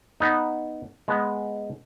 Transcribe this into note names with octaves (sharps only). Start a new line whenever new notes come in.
B3 D#4
G#3 B3